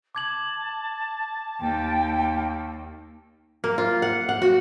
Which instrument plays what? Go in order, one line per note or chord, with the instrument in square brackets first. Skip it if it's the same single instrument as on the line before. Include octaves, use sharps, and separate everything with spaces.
[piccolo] A5 [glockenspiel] D6 G#6 F#7
[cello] D#2 [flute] G5
[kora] A#3
F4
F#5
F#5
F#4